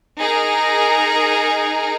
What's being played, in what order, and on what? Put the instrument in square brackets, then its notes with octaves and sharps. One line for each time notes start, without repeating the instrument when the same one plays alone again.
[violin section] D#4 G#4 A#4 A#5